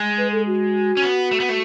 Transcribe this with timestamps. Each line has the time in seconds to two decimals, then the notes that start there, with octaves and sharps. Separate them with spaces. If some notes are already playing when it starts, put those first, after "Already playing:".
Already playing: G#3
0.18 B4
0.32 A4
0.47 F#4
0.97 C#4
1.02 B3
1.31 A3
1.40 B3
1.49 A3